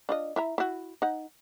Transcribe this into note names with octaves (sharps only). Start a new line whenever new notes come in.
D4 F4 D#5
E4 E5 A#5
E4 F#4
D#4 F#5